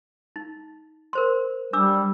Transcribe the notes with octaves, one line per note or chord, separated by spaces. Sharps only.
D#4
A#4 C5 C6
G3 D4 D6 E6